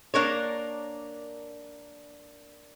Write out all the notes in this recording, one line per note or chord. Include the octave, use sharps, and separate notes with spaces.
A#3 D4 A#4 C#5